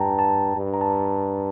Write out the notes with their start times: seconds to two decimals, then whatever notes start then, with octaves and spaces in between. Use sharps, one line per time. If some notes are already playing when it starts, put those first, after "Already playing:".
Already playing: G2 G5 A5 A#5
0.19 A5
0.57 G2
0.74 A#5
0.81 A5